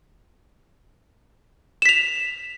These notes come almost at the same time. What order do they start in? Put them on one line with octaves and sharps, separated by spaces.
E7 B6 F7